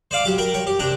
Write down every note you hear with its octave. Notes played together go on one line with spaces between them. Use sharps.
C5 D5 F5 D6
F#3 G4 D6
A#4 G5 A#5 B5
C#5 G5
G4
C3 D4 G5 A#5